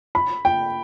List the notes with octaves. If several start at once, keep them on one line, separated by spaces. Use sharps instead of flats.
B5
G5